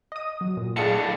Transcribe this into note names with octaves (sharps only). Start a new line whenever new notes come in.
D#5 D#6
F#3
A#2
A2 D4 G#4 F5 C#7